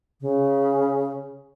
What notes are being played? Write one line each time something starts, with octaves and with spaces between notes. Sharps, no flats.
C#3